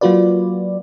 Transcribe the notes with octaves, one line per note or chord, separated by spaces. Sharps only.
F#3 A#3 F4 F#4 B4 D5